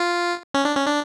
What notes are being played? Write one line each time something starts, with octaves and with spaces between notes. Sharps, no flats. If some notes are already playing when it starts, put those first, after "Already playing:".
Already playing: F4
C#4
D4
C#4
D4